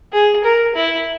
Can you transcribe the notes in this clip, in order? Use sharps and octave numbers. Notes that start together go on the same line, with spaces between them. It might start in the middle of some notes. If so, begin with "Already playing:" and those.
G#4
A#4
E4